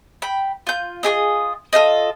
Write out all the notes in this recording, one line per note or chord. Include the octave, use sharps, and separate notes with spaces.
G5 B5
F4 G6
F4 G4 G#4 D#5
F4 A4 C5 D#5